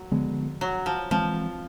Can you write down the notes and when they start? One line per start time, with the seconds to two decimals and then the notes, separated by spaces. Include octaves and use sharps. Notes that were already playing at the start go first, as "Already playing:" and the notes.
Already playing: F#3
0.11 D3 F3 G#3 B3
0.61 F#3
0.86 F3
1.11 E3 F3 G#3 C4